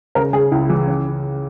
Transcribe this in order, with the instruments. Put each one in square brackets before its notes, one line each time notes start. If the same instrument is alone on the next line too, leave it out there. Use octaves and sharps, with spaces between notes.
[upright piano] C#3 [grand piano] A#4
[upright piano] C#3 [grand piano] G#4
[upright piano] C#2 [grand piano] E4
[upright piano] E3
C#3